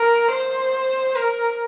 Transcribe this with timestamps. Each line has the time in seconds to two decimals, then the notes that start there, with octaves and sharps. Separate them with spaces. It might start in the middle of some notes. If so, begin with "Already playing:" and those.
Already playing: A#4
0.31 C5
1.15 A#4